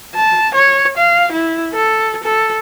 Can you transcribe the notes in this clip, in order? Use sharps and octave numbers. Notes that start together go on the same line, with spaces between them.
A5
C#5
F5
E4
A4
A4